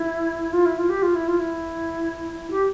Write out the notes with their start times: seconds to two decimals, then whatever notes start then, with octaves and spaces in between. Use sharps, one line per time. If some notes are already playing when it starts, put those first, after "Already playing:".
Already playing: E4
0.53 F4
0.66 E4
0.78 F4
0.90 G4
1.02 F4
1.15 E4
1.28 F4
1.39 E4
2.50 G4